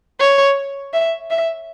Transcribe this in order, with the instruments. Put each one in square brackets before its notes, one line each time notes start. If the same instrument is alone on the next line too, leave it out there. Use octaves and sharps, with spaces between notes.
[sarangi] C#5
E5
E5